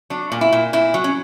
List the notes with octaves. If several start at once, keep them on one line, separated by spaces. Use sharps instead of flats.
F#3 D4
A#2
E4
A#2
A#2 E4
F#3
C#4